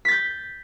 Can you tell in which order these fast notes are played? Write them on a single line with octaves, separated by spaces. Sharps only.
B6 A6 G6